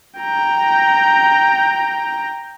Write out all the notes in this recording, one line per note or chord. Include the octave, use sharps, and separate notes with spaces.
G5 A#5